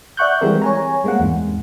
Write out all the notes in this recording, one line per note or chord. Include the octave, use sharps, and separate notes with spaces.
D5 E5 F#5 C#6 F#6 G6
E3 G3 G#3 C4 A#4
C#5 G#5 A#5
G3 G#3 A#3 C4 F#5
E2 G#2